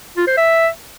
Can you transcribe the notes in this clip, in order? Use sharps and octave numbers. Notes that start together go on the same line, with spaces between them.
F4
C5
E5